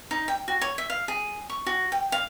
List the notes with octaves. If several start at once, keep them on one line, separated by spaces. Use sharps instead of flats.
D#4
G5
F#4
C#5
E5
F5
G#4
C#6
F#4
G5
F5